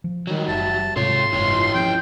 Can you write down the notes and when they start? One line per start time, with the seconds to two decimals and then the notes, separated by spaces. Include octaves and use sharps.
0.04 F3
0.27 D#3 F#3 G3
0.48 F#1 E5 A5
0.96 G#2 C3 F4 A4 C#5 C6
1.32 F#1 G#2 E4 G4 C#5
1.75 F3 C#4 G5